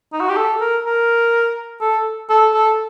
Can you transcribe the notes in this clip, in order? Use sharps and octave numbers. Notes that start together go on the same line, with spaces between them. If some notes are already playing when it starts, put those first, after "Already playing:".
D#4
F#4
G4
A4
A#4
A#4
A4
A4
A4